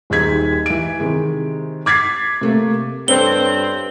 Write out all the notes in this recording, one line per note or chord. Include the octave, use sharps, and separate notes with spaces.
D#1 D#2 G#3 D#4 G#6 B6
E3 D7
C3 D#3 G#3
D6 G#6 A6 B6 C7
C3 A3 A#3
G2 C4 A4 B4 C#5 G7